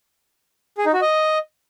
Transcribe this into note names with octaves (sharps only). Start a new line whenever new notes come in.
G#4
D#4
F#4
D#5